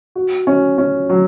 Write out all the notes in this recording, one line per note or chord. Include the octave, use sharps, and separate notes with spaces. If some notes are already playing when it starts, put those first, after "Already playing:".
F#4
C#4
C#4
F#3